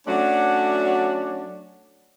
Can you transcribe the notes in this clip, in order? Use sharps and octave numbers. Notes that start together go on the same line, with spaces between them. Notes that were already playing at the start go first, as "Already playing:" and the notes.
F#3 A3 C#4 D4 F#4 D5